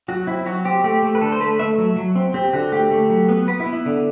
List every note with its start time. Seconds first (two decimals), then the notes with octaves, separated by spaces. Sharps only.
0.08 F#3 F#4
0.27 C4 E4
0.46 F#3 F#4
0.65 C4 G4
0.84 A3 G4
1.03 A3
1.15 B4
1.21 D3 A4
1.32 C5
1.40 A3 B4
1.59 A3 E5
1.78 F#3
1.96 F#3
2.15 C4
2.34 C4 G4
2.53 D3 F#4
2.72 A3 G4
2.91 A3
3.10 F#3
3.29 B3
3.47 B3 B4
3.60 E4
3.66 B3
3.73 E4
3.86 D3